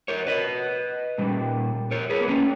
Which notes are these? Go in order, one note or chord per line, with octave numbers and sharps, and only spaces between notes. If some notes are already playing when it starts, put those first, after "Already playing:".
A#4 C#5
B4 D#5
A#2 G3
A#4 C#5
G#4 B4
B3
A#3 C#4